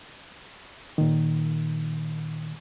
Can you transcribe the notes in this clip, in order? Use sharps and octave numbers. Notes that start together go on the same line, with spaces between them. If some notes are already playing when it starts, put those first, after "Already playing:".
A#2 D#3